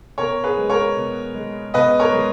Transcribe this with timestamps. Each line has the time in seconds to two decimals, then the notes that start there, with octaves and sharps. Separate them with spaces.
0.18 B2 A#4 C#5
0.44 G#4 B4
0.57 G#3
0.70 A#4 C#5
0.97 B2
1.34 G#3
1.74 B2 B4 D#5
2.00 A#4 C#5
2.12 G#3